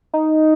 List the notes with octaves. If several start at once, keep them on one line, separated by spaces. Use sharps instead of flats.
D#4